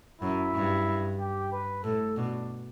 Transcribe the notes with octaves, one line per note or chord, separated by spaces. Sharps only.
F#2 E4
G2
G4
B4
A2 A4
B2 D4